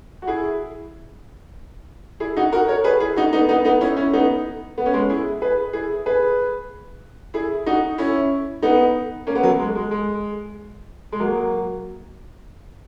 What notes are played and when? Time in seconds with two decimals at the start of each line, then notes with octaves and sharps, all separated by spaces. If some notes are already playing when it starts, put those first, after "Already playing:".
0.22 F#4
0.27 E4 G#4
2.20 E4 G#4
2.37 D#4 F#4
2.52 F#4 A#4
2.68 A#4 C#5
2.84 G#4 B4
3.00 E4 G#4
3.16 D#4 F#4
3.33 B3 D#4
3.49 B3 D#4
3.65 B3 D#4
3.81 C#4 E4
3.97 C#4 E4
4.13 B3 D#4
4.78 B3
4.86 C#4
4.94 G#3 B3
5.10 E4 G#4
5.42 G#4 B4
5.73 E4 G#4
6.06 G#4 B4
7.34 E4 G#4
7.66 D#4 F#4
7.98 C#4 E4
8.62 B3 D#4
9.27 A#3 C#4
9.35 B3
9.43 F#3 A#3
9.59 G#3
9.75 G#3
9.91 G#3
11.12 G#3
11.20 F#3 A#3